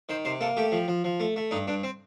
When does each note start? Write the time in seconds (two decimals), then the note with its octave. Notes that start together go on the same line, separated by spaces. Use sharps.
0.09 D#3 C5
0.25 C3 C5
0.41 A#3 A4
0.57 A3 G4
0.72 F3
0.88 F3
1.04 F3
1.20 A3
1.36 A3
1.51 G2 D#4
1.67 G2 D4
1.83 C4